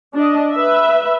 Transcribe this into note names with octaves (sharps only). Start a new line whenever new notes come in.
D4 D#5
B4 E5